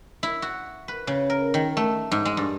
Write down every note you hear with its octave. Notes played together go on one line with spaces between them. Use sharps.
E4
F#4
B4
C#3
A#4
D#3
A3
G#2
G#3
G2